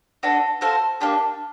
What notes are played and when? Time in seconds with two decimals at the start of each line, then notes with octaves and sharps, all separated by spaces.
0.23 B3 D4 F#4 A4
0.61 F#4 A4 C5 F5
1.00 A#3 D4 G4